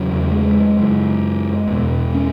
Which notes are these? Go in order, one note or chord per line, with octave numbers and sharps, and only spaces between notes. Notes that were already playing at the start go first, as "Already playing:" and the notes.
Already playing: E2 C#3 F#3
G#3
F#2 C#3
E2 B2
C#4